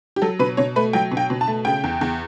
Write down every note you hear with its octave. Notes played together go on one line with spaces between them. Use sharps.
G4
F#3 A4
B2 B4
B2 C#5
A3 B4
F#3 G5
B2
G5
B2
A5
A3
C#3 G5
E2
E2